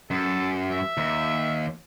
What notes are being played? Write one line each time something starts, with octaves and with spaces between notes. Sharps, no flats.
F#2 A4
E5
D#2